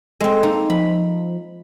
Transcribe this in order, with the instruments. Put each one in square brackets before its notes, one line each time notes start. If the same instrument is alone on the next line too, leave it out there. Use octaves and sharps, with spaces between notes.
[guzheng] G#3 C4 [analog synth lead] A4
[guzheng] A#3 D#4
[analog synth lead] F3 [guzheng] B5